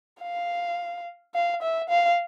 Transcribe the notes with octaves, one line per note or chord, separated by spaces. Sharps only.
F5
F5
E5
F5